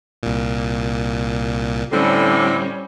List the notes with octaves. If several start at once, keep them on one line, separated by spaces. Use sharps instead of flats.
C2 A#2
A2 D3 G3 C4 C#4